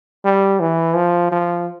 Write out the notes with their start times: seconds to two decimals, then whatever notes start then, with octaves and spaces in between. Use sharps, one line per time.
0.25 G3
0.60 E3
0.95 F3
1.32 F3